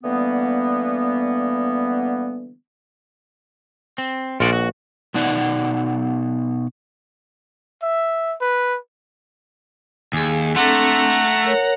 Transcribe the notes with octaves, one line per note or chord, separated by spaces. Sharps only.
D3 E3 G3 A#3 B3
C4
A#1 F4 F#4 D5
F#4
B2 B3 D#4 D5 F#5
E5
B4
D#2 G#4 G#5
A3 C4 D4 A4 F#5 A#5
A#4 C#5